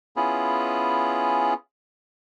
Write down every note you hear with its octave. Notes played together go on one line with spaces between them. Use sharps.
B3 C#4 E4 F4 G#4